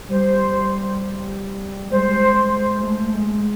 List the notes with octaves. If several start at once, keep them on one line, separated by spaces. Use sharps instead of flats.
G3 C5
G#3 C5
A3
A3
G#3